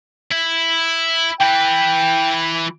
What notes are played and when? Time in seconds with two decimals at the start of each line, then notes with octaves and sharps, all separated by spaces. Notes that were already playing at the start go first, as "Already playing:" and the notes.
0.32 E4
1.41 E3 B4 G5